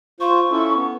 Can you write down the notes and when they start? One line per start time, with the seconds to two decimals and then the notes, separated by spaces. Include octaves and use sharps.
0.20 F4 C5 C#6
0.51 C#4 E4 A4
0.74 B3